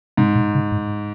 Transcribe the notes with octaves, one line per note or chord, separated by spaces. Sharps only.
G#2 C3
A#2
C#3
G#2